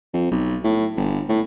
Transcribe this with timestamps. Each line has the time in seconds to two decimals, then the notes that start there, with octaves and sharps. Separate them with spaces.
0.13 F2
0.31 B1
0.64 A2
0.97 G1
1.29 A2